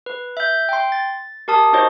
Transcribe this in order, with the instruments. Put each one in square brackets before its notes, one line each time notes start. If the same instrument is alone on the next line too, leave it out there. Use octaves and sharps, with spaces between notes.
[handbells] B4
E5 G6
G5 C6
A6
G4 A#4 A5 D#6
D#4 F#4 C5 C#5 D#5